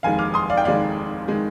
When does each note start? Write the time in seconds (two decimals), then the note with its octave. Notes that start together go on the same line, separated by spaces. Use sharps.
0.03 F1 D#2 D#3 G#3 F5 G#5
0.19 D6 F6
0.34 C6 D#6
0.50 D5 F5
0.58 G5
0.65 F1 D#2 D#3 G#3 D5 F5
1.28 D#3 G#3